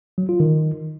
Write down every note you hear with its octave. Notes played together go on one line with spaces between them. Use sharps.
F#3
F4
D#3